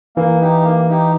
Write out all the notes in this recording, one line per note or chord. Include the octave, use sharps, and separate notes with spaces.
E3 A#3
D#4 G4
A#3
D#4 G4